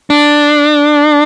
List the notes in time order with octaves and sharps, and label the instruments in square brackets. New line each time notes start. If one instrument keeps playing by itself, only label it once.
[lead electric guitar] D4